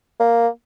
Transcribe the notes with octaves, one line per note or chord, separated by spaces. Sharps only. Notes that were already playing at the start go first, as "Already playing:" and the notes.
A#3